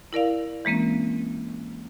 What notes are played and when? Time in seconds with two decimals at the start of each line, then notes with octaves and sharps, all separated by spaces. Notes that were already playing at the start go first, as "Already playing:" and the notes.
0.13 E4 A#4 D5 F5
0.65 E3 G#3 A#3 C4 C#4